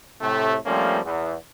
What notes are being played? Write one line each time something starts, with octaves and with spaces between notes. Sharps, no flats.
A2 C3 A3
F3 G3 A3 A#3 C4 C#4
E2